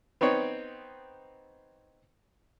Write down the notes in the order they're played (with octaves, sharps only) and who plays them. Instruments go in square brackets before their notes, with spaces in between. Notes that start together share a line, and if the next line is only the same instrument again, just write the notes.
[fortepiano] B3 C4 D#4 C#5